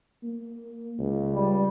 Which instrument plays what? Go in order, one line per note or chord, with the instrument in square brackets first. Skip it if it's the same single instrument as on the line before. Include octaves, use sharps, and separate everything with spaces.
[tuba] A#3
C#2
[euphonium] G3